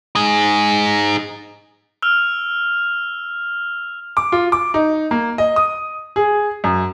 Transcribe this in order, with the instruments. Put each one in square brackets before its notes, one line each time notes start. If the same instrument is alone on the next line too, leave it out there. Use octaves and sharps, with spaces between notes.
[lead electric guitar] D#4 G#4
[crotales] E6 F6 F7
[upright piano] D6
F4
D6
D#4
A#3
D#5
D#6
G#4
F#2